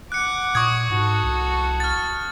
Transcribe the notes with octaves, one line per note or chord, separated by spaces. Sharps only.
F#5 D6 F#6 C#7
A#2 C#6 D#6 G#6
G#2 F#4 A4
C2
F6 A6